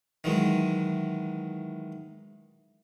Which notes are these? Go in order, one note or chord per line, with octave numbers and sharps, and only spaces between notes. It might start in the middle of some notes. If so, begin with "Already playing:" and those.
D#3 E3 F#3 G#3